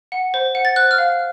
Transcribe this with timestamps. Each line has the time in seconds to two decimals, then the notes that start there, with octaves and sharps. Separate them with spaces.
0.12 F#5
0.34 C5
0.55 F#5
0.65 A6
0.76 C5 F#6
0.91 F6
0.98 F5